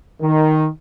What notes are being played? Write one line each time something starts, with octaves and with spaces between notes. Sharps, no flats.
D#3